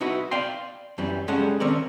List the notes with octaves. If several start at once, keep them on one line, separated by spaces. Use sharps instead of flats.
D#4 E4 F#4 B4
D5 F5 G5 C6
F#2 E3 G3
G3 G#3 C#4 A4 F#5
D#3 C4 C#4 A#4 D5